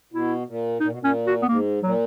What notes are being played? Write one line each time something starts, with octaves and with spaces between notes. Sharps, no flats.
B2 E4
A#2
A#2 D#4
B2
A#2
C#4
F#4
B3
G#2 A#3
A#2 F#3